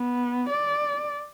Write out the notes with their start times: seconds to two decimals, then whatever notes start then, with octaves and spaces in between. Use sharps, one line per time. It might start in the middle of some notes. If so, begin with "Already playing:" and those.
Already playing: B3
0.49 D5